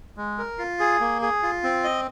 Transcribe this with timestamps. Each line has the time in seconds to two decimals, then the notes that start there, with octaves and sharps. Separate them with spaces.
0.17 G#3
0.38 A#4
0.59 F4
0.80 G#4
1.00 A#3
1.22 G#4
1.43 F4
1.63 C4
1.84 D#5